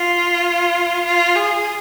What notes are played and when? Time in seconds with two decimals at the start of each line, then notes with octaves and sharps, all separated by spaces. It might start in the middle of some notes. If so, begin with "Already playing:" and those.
Already playing: F4
1.05 F4
1.36 G#4